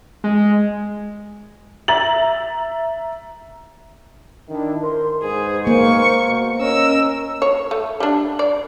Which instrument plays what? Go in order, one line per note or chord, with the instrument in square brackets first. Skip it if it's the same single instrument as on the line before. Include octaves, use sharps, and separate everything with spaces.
[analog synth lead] G#3
[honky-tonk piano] E5 A#5 A6 F#7
[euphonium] D#3 [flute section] D4 E4 E5
[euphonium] A#4 [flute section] C5 C6
[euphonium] G#2 [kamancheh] G#4 [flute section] B4 C5
[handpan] A#3 [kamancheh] C#6
[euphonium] B2
[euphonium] C#4 [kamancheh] A#4 E6 [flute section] D#5
[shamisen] C#5
A3
G3 D4
D5